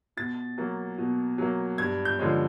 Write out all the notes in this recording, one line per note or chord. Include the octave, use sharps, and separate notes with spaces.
B2 A6
F#3 A#3
B2
F#3 A#3
G2 G#6
G6
D3 F3 G#3 C#4